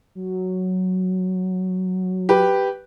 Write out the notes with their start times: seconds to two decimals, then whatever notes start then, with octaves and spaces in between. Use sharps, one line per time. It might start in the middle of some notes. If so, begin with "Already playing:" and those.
0.15 F#3
2.29 G4 B4